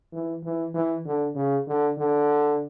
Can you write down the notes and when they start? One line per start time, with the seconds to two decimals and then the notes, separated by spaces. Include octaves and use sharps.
0.13 E3
0.44 E3
0.74 E3
1.05 D3
1.35 C#3
1.67 D3
1.97 D3